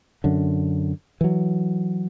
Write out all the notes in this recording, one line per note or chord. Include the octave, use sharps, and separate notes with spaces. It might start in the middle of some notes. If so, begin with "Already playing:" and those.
F#2 D3
E3 F#3